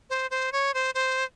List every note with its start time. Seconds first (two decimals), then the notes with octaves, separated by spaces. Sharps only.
0.10 C5
0.31 C5
0.52 C#5
0.74 C5
0.95 C5